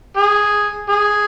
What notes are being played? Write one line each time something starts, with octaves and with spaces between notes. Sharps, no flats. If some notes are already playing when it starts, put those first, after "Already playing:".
G#4
G#4